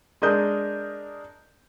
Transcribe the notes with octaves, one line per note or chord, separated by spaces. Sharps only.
G#3 D4 A#4 D#6 G6